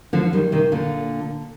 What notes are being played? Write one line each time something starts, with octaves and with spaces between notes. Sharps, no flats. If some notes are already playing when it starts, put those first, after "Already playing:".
D3 F3
D#3 G3
C3 D#3
A#2 D3